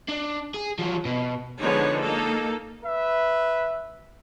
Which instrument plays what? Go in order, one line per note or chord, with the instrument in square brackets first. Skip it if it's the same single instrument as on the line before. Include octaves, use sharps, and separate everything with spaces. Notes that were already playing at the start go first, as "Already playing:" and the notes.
[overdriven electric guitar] D4
G#4
F3 F#3
B2
[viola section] D3 F3 G#3 B3 D#4 C#5
A#3 D#4 A4
[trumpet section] B4 E5